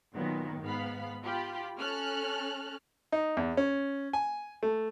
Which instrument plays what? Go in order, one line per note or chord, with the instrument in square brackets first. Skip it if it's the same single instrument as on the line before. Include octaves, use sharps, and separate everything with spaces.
[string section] A#2 D#3 F#3 B3
G#2 B3 F5 B5
F4 G4 B5
C#4 A4 F6 F#6
[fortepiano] D#4
E2
C#4
G#5
A3